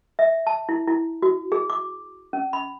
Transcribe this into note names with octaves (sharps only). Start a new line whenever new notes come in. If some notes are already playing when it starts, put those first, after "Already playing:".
E5
A5
E4
E4
F#4
G#4
D6
C#4
B5